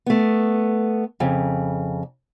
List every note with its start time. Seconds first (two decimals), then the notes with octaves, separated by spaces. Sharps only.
0.06 A3 B3
1.20 F2 C#3